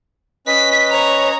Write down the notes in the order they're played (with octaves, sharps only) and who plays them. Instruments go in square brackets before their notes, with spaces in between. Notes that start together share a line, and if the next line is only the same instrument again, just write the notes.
[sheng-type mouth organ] C#4 B4 D#5 [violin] B6
[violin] C#5 A#5